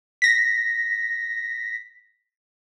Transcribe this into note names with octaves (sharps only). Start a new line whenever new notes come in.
A#6 B6